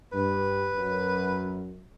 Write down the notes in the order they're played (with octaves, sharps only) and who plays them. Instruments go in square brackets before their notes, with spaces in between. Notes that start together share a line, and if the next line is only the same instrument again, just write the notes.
[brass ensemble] G2 [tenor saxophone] B4
[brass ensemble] F#2